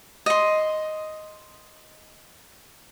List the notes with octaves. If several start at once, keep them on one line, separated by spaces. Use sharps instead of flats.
D#5 C6